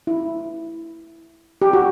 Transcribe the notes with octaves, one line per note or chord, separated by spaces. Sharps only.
E4
G4
F#4